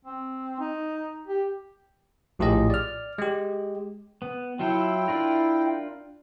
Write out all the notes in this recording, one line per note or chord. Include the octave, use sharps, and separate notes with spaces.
C4
D#4
G4
A#1 A2 F4 G4 G#4 D#5
D5 F6
G#3 G4
B3
F#3 E4 F4 A4 G5
D4 F4 A#4